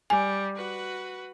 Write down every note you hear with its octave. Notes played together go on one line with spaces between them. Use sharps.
G3 G#5
F#4 B4